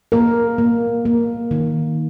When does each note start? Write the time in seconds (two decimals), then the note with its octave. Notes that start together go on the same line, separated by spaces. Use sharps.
0.12 A#3 A#4
0.58 A#3
1.05 A#3
1.51 D#3